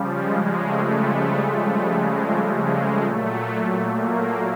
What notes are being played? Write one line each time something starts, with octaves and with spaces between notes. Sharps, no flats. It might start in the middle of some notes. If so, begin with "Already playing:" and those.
Already playing: C#3 F3 G3
G#3
A3
A3
A3
G#3
G3
G#3
A#2 F#3 A3
A#3